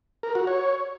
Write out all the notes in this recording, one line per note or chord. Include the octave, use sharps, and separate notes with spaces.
A#4
F#4
C#5